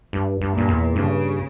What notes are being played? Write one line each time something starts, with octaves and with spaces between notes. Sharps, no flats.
G2
G2
G2 A#2
E2
G2 C#3